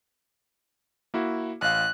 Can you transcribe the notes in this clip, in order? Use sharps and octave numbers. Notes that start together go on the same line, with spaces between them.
A#3 E4 F#4
A1 F5 F#6